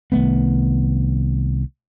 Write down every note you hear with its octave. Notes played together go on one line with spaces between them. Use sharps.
C2 D#3 A3 B3